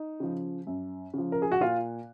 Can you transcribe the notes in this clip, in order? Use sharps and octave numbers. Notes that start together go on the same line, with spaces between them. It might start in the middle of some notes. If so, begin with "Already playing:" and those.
Already playing: D#4
C#3 F3
F#2
C#3 F3
A#4
G#4
F#4
A#2 F4